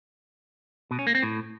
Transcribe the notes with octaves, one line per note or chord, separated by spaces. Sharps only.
B2
C#4
A#3
C4
A2